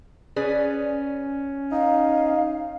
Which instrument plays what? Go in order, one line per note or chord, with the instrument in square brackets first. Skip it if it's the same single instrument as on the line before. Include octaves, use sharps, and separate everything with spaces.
[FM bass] C#4 [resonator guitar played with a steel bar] G#4 B4 D5
[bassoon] D#4 [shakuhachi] F5